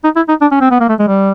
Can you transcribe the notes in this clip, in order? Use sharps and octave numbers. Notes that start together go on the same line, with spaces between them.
D#4
E4
D#4
D4
C#4
C4
B3
A#3
A3
G#3
G3